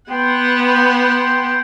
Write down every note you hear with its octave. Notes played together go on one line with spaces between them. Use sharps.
B3 F#5 G5 C6